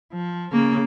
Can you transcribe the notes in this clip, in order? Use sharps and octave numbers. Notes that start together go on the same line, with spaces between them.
F3
C#3 A#3